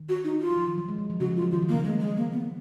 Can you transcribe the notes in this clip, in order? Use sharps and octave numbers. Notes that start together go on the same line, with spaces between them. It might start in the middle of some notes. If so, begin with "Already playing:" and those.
Already playing: D#3
F#4
D#4
F4
F#3
F3
D#3
F#3
G#3
F#3
F3
C#3 F#4
F3
F4
F#3
D#3 F4
D#3
A#3
C#3
D#3 G#3
D#3 G#3
D#3 A#3
B3